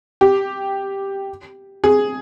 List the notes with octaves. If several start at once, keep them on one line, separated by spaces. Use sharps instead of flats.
G4
G#4